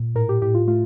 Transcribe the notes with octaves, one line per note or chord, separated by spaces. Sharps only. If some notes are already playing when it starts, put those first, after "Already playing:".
Already playing: A#2
A2 A#4
G4
A2 G4
F4
A3 F4